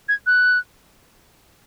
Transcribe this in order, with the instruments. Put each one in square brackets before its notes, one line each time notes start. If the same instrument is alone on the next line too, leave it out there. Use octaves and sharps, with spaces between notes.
[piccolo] G#6
F#6